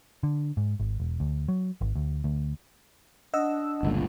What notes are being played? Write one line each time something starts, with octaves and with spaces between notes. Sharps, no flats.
D3
G#2
G#1
E1
D2
F#3
G#1
D2
D2
D4 D#5 F#5 E6
G1 C#2 A#2